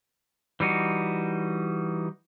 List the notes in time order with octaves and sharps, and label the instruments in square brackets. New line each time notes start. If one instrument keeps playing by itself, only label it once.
[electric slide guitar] E3 G3 D#4 F#4